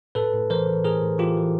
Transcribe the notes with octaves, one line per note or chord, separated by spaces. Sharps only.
A2 A4 B4
A2
E3 A#4 C5
E3
A2 G#4 A#4
A2
E3 F4 G4
E3